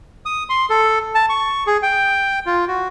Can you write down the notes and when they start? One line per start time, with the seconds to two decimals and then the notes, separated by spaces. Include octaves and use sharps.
0.26 D#6
0.50 C6
0.70 A4
1.15 A5
1.30 C#6
1.67 G#4
1.83 G5
2.46 F4
2.68 F#4